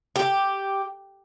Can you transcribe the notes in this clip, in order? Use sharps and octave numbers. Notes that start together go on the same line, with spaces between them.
G4